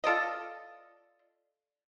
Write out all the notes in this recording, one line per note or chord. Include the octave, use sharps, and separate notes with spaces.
F4 A4 D5 D#5